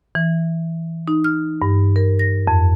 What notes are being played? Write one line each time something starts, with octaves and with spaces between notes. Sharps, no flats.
E3
D#4
F6
G2
A#4
A#6
F2